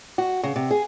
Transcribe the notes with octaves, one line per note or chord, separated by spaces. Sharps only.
F#4
C#3
C3
G#4